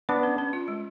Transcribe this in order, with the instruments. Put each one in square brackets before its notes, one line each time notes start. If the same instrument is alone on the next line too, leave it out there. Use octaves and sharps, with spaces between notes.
[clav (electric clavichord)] B3 D4 [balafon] D5
[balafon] C#4
C#4
F4
G#3